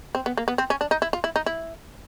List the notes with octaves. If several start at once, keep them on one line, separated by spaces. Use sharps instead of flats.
C4
B3
A#3
B3
C4
C#4
D4
D#4
E4
F4
E4
D#4
E4